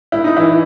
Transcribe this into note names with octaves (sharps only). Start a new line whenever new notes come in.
E4
D#4
E3 E4